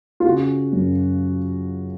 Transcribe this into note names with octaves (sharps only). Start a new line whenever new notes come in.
F4
C#3 F#4
F#2